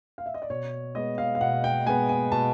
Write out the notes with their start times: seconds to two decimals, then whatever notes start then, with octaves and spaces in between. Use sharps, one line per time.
0.18 F5
0.26 E5
0.34 D#5
0.42 D5
0.50 B2 C#5
0.95 G#3 B3 D#5
1.18 F5
1.35 F5
1.41 B2 F#5
1.64 G5
1.86 G#3 B3 G#5
2.09 G#5
2.32 B2 A5